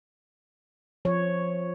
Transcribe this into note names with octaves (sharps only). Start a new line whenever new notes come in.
F3 C#5